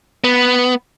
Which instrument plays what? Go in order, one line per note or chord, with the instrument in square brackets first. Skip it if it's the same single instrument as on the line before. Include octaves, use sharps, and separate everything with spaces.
[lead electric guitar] B3